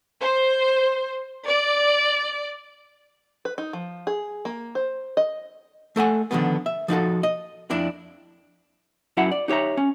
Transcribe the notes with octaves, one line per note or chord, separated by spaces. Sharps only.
C5
D5
B4
D#4
F3
G#4
A#3
C5
D#5
A3 A4 F#5 G#5
D3 D#3 F3 A3 B3
E5
F3 D#4 F#4 A4
D#5
F2 D4 E4
F#2 F#3 E4 E5 F#5 B5
D5
D#4 G4 C#5 E5 A#5
C#4